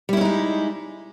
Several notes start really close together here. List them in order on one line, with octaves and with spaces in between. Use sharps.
G3 E4 C#4 D#4 G#3